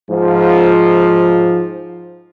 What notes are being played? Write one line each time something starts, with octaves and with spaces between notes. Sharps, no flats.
G#2 F3